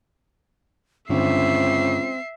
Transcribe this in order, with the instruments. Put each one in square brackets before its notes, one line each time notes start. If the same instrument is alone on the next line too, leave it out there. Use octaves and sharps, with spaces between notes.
[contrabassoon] C#2 [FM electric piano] G2 D3 D4 [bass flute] C4 [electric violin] E5 C7